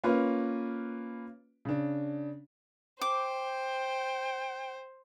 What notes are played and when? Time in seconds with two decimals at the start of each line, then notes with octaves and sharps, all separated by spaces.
0.04 A#3 C#4 F4 B4
1.65 C#3 D4
3.01 C5 G5 D6